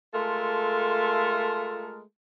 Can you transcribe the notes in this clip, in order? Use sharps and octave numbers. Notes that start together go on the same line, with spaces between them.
G#3 A3 F4 A4 A#4